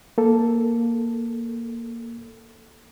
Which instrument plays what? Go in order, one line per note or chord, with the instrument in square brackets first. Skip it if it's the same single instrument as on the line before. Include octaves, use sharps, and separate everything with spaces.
[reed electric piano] A#3 A4